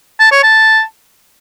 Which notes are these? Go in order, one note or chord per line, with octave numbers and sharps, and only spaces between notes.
A5
C#5
A5